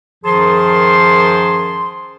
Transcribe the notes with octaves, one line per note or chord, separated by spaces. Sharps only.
F#2 D#3 F3 G#4 A5 C6